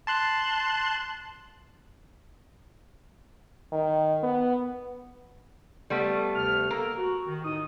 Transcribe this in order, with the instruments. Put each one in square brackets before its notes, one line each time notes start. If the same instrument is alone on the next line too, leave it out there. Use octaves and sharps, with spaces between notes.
[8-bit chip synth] A5 C6 F#6
[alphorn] D#3
B3
[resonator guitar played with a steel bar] G3 A3 B3
[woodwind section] D2 C3 F6
[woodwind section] A#3 A4 [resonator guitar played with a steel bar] A#4
[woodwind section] F#4
D#3
A2 D#4 D#6